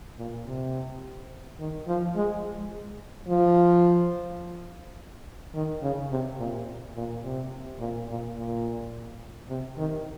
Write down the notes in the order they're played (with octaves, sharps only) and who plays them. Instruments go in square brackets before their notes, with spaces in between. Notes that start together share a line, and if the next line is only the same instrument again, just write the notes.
[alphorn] A#2
C3
D#3
F3
G#3
F3
D#3
C#3
C3
A#2
A#2
C3
A#2
A#2
A#2
C3
D#3